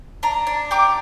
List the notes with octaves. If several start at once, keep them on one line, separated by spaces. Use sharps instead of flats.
D4 A#5
D4
G4 D6